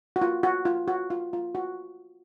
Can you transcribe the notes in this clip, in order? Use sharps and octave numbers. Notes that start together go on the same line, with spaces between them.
F#4
F4
F#4
F4
F#4
F4
F4
F#4